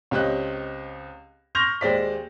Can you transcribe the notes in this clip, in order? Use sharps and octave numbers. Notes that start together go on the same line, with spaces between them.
C#2 C4 G4 C#5 D#5 F#6
C6 C#6 F6 G6 A#6 F7
D#2 G#3 C5 D5 B6